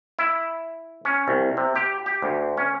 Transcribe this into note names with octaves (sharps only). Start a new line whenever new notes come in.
E4
C#4
C2
C3
G4
G4
D2
C#4